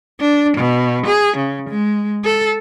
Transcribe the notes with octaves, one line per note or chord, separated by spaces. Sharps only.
D4
B2
G#4
C#3
G#3
A4